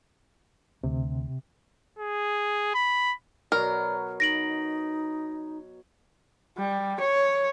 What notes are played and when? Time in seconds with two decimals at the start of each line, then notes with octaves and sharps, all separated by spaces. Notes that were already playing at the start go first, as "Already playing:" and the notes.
0.83 D2 C3
1.99 G#4
2.75 B5
3.52 B2 F#3 A#4 D5 F6
4.20 D#4 A#6 D7 F#7
6.58 G3
7.00 C#5